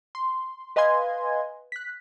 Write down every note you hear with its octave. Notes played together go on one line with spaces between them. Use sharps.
C6
B4 D#5 F5 G#5 C6 G#6
F#6 B6